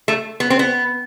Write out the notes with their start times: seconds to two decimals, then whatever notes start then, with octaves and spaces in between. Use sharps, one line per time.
0.08 A3
0.40 B3
0.50 C4
0.59 B3